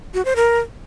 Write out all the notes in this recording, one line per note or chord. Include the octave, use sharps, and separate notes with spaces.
F#4
C5
A#4